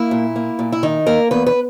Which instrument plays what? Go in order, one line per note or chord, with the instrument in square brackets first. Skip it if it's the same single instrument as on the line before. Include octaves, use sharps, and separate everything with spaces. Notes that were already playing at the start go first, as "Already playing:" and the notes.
Already playing: [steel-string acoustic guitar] A#3 E4
A#2
A#3
A#2
E4
D#3 D#4
A#3 A#4
E2 B4
B4